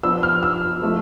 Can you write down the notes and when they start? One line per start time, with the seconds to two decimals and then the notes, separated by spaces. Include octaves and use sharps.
0.03 F3 B3 D4 E6
0.23 F6
0.43 E6
0.82 F3 A3 E4